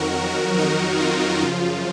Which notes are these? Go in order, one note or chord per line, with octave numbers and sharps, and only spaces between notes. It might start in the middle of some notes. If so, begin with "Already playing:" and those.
Already playing: F2 D#3 F#3 F#4 A#4
D#4 F#4
F4
F#2 C#3 F3 F4